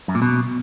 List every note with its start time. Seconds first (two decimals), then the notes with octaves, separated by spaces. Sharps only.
0.08 F#2
0.15 A#2
0.22 B2